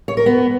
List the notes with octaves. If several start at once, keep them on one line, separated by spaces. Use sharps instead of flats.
C#5
A#4
B3